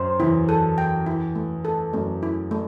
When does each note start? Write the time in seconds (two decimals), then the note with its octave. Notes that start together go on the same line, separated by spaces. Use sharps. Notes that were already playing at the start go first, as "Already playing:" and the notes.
Already playing: F#2 C5
0.20 E2 E4
0.49 A4
0.78 G5
1.06 E4
1.35 A3
1.65 A4
1.93 F#2 A3
2.23 E4
2.51 A3